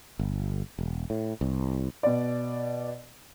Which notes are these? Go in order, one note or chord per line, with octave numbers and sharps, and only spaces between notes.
G1
E1
A2
C2
B2 D5